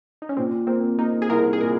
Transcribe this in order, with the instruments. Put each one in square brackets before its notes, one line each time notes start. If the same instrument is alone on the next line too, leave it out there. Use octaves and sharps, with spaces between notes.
[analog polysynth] D#4
C#4
[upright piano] A#2 [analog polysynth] C4
[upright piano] A#3 [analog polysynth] C4
[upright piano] A#3 [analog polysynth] D#4
[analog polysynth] G#4
[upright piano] C2 [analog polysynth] A#4
[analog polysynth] G#4
[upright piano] A#2 [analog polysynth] A#4